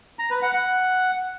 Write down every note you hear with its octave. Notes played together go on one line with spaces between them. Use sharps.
A#5
B4
F#5
F#5